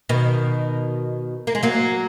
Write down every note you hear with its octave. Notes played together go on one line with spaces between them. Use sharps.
B2 D#3
A#3
G#3
F#3 A#3